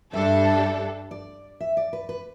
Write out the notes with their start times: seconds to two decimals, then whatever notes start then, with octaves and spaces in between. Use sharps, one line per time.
0.13 G2 G3 D4 A4 E5
1.11 D5
1.60 E5
1.77 D5
1.93 B4
2.09 B4